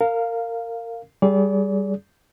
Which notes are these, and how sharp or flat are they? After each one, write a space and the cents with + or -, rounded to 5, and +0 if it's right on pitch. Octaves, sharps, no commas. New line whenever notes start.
A#4 -25 F5 +0
G3 +0 G#4 +15 D5 -35